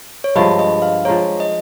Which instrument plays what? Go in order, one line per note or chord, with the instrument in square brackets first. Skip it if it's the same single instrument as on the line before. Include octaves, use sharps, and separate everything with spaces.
[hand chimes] C#5
[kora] G2 F3 G#3 [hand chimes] D#5
[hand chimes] D#5
F5
[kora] F3 G#3 D#4 [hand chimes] C#5
[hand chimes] D#5